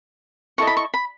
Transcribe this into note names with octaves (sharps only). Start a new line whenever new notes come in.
E4 A4 D#5 C#6
B5
C#6
B5